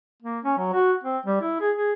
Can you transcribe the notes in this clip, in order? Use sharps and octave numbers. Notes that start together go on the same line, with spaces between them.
A#3
C#4
F#3
F#4
C4
G3
E4
G#4
G#4